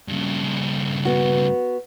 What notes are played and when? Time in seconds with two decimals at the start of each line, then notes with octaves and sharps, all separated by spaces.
0.08 G2 C#3
1.05 B3 F#4